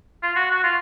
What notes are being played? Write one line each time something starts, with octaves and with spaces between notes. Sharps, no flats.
F4
F#4
F#4
F4